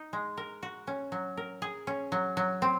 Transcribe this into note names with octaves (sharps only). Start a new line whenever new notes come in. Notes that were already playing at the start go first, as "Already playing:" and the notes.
Already playing: D#4
G#3
A#4
F#4
C#4
F#3
A#4
G#4
C#4
F#3
F#3
C4